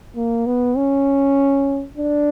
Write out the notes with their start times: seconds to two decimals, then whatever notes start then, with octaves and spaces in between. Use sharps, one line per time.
0.16 A#3
0.46 B3
0.77 C#4
1.97 D4